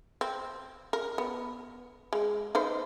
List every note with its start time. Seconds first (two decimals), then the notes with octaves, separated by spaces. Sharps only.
0.21 C4
0.93 A#4
1.18 B3
2.13 G#3
2.55 D#4 B4 C5